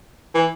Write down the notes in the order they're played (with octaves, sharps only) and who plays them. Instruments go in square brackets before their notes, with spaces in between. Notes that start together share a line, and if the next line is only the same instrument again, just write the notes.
[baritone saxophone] E3